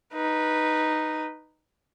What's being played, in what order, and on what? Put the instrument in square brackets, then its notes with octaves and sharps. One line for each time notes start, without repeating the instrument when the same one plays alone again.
[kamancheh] D#4 B4